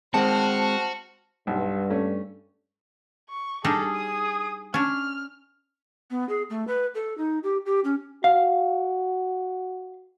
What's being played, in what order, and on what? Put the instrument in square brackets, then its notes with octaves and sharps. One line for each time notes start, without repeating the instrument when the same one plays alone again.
[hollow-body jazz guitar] G#3 C4 [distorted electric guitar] F#4 [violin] C5 F6 [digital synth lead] A5
[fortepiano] B1 [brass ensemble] G2
[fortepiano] A3 C#4
[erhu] C#6
[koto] G3 D4 D#4 [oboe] G#4 [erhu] A4
[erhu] D#6
[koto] C#4 D4 [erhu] F6
[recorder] B3
G#4
A3
B4
A4
D#4
G4
G4
C#4
[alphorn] F#4 [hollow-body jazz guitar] F5